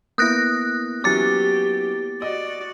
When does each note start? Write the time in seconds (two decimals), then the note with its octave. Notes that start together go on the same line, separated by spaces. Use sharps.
0.18 A#3 B3 E4 D#6 F#6 A#6
1.04 E3 F#3 C#4 G4 D6 A6
2.22 F#4 D5 D#5